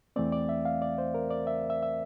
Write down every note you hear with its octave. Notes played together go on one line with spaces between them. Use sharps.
E2 E3 A3 C4 D5
D5
E5
F5
D5
C5
A#4
D5
E5
E5
E5